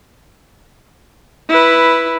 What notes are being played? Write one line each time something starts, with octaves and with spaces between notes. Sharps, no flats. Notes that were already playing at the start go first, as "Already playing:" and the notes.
E4 B4